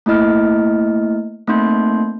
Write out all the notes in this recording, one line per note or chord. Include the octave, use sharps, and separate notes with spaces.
A3 A#3 E4 D#5 F6
A3 A#3 C4 D#4 C6 G6